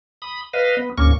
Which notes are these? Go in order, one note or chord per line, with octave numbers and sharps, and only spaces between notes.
B5 D#6
B4 D#5 F5
B3
D2 G#2 A#3 C#4 C#6